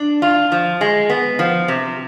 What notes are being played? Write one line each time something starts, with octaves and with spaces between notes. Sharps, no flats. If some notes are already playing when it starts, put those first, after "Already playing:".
Already playing: D4
F4
F3
G#3
B3
F3
C3